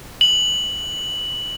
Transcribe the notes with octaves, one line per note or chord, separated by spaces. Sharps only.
F#7